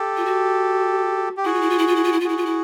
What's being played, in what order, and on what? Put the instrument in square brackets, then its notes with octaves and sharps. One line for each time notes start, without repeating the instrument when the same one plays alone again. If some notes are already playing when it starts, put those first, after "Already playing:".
Already playing: [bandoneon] G4 A4
[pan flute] F4
F#4
[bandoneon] G4
[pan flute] E4 [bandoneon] F#4 G#4
[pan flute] F4
E4
F4
E4
F4
E4
F4
E4
F4
[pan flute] E4 [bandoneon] F#4 G#4
[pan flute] F4
E4